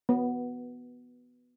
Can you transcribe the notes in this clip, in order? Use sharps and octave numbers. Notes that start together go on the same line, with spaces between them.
B3